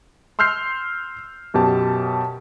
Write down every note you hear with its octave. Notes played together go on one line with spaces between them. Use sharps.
C6 E6 F6 G6 C7
F#2 B2 G4 A5